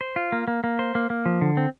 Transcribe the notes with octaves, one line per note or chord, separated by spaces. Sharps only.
C5
F4
A#3
A#3
A#3
C5
A#3
A#3
F3
D3
C4